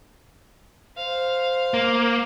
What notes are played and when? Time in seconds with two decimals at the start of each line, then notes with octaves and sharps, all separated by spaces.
0.97 C5 F5
1.74 A#3